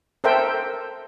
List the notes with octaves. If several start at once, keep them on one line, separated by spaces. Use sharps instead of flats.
A4 A#4 C5 E5 G5